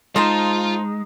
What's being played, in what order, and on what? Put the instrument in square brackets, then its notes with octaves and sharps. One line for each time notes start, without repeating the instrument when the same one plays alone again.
[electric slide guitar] G#3 [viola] D#4 [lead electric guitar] F4 [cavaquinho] C5 A5 C6